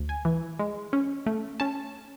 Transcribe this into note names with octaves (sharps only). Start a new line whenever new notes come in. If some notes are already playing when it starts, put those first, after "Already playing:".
Already playing: D2
G#5
E3
G#3
C#4
A3
C#4 A5